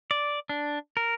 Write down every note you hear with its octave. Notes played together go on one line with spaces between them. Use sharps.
D5
D4
A#4